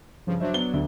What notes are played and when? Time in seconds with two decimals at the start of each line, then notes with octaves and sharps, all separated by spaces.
0.27 G2 C#3 F3
0.40 F#3 D4 C5 E5
0.54 B3 G7
0.73 D2 D3